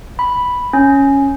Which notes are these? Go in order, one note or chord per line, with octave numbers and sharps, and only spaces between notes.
B5
C#4